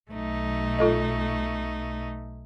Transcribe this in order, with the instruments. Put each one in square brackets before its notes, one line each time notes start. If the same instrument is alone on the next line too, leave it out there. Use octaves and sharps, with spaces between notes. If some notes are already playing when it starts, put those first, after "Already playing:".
[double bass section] B1 [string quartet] A3 D#4
[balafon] F4 A4 D#5